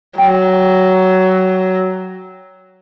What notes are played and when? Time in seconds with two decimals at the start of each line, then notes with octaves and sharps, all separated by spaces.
0.18 F#3 G5